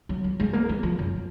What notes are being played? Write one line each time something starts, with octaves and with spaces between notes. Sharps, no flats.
F#3
F#3
G#3
A#3
G#3
F3
F#2